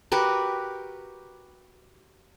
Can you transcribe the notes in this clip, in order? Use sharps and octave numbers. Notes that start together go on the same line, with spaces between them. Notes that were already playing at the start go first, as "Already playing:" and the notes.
F#4 G4 A#4 B4